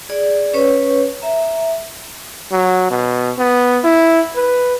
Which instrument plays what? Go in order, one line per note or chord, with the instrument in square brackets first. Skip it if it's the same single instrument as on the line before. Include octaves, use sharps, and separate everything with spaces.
[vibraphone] G#4 D5
C#4 B4 C#5 C#6
E5 A#5
[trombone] F#3
B2
B3
E4
B4